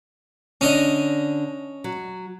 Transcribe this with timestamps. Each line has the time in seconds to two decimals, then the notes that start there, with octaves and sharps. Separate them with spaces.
0.61 D3 C#4 D4 D#5
1.84 F#3